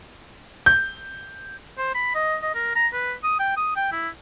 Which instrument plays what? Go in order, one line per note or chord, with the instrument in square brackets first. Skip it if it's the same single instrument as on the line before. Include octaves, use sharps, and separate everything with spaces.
[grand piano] G6
[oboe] C5
B5
D#5
D#5
A#4
A#5
B4
D#6
G5
D#6
G5
E4